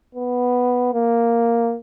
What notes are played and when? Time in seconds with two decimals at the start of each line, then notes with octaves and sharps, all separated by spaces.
0.15 B3
0.94 A#3